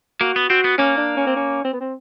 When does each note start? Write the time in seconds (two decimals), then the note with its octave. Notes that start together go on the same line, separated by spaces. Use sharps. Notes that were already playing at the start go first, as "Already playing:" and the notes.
0.21 A#3 F#4
0.36 B3
0.50 C4 F#4
0.64 B3
0.78 A#3 C#4
0.98 D4
1.17 C#4
1.27 C4
1.36 C#4
1.64 C4
1.73 B3
1.80 C4